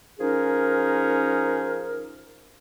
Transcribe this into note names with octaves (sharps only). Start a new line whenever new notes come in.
F3 C#4 D#4 G#4 A#4